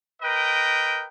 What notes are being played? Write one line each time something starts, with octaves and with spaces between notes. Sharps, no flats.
A#4 B4 D#5 G5